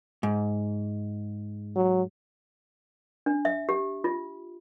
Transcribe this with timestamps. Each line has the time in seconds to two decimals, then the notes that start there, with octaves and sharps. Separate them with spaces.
0.23 G#2
1.76 F#3
3.26 D4
3.45 E5
3.69 G4
4.04 F4